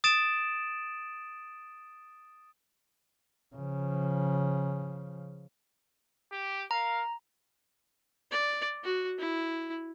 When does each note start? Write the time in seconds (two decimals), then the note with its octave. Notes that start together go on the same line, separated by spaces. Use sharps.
0.04 D#6 A6 D7 E7
3.56 C#3 F3
6.32 G4
6.71 A#4 F5 A#5
8.32 D5
8.84 F#4
9.19 E4